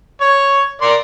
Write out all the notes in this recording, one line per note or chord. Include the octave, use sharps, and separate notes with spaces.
C#5
A#4 D5 C6